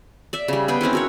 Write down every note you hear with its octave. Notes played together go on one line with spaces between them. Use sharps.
D5 E5
C#3 G3
B3 G#4 G5
C4 C#4 D#4 E4
F#4 A#4 C#5